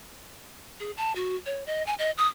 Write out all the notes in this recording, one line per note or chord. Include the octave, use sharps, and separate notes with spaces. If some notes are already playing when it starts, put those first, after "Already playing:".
G#4
A5
F#4
C#5
D#5
G#5
D#5
D#6